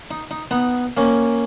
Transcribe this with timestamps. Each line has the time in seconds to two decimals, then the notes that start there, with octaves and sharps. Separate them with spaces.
0.11 D#4
0.31 D#4
0.51 B3 D#4
0.97 A#3 C#4